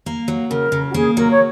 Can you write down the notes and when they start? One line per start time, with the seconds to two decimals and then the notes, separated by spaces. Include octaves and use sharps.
0.06 A#3
0.28 F#3
0.50 C#3 A#4
0.72 C#3
0.90 F#4
0.94 A#3 G#4
1.17 F#3 A#4
1.30 C#5